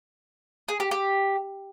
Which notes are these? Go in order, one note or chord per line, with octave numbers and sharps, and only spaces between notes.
G#4
G4
G4